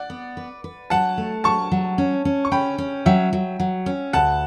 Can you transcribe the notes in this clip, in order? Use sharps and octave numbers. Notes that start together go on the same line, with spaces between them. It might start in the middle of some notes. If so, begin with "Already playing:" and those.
Already playing: D5 F#5
B3
B4
B4
F#3 F#5 A5
A3
F#3 A5 C#6
F#3
C#4
C#4
C#6
C#4 G5 B5
C#4
F#3 E5 G5
F#3
F#3
C#4
D2 F#5 A5